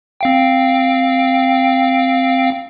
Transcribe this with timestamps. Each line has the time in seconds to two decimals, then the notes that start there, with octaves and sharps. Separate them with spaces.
0.21 C4 F5 G5